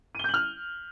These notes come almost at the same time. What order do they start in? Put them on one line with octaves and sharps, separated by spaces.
D#7 G7 G6 F#7 F6